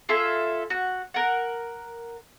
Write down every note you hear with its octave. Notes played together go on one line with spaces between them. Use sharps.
F4 G#4 A4 E5
F#4
A#4 F#5